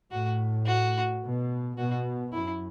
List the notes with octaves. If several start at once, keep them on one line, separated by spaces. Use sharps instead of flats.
A2 F#4
F#4
B2
B2 F#4
F#2 E4